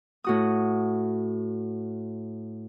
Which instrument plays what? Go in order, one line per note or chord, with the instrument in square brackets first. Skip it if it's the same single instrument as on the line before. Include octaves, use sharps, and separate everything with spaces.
[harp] A2 F#4 D#6